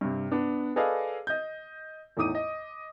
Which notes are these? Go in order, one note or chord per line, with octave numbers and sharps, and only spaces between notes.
G2 C3
B3 D4
G#4 A4 B4 D5 D#5 F5
D#5 G6
E2 A2 D#4 D6 D#6 D#7
D#5